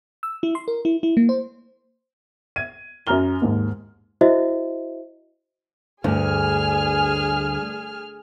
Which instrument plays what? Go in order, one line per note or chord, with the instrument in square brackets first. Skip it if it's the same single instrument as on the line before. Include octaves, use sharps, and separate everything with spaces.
[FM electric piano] E6
E4
C6
A#4
E4
E4
A#3
C5
[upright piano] G#6 D#7
F#2 C#4 A#5 F6 G7
D#2 G#2
[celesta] E4 F#4 C5 D#5 E5
[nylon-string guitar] D2 [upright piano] G2 [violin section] G#4 G#5 F6